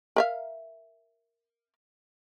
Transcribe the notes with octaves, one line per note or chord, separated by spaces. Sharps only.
A#4 E5 F5